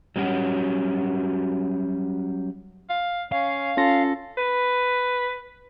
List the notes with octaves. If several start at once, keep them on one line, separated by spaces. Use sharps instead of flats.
F#3 G3 C#4 F#4
F5
C#4 F5
C#4 F4 A4 A#6
B4